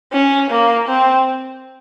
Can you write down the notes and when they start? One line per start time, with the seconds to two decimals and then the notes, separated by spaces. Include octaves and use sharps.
0.13 C#4
0.50 A#3
0.88 C4